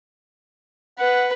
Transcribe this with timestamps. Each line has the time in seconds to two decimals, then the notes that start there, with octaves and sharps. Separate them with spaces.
0.99 B4 F#5